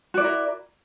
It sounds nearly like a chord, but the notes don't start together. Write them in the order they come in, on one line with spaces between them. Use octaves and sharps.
F#4 D5 E4 A#4